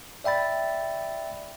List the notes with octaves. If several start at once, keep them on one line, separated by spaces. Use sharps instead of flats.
D5 E5 G5 B5 A6